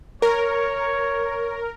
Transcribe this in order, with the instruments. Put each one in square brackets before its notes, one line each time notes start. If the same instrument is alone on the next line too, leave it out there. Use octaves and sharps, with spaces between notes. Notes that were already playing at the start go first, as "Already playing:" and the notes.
[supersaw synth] A#4 [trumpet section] C#5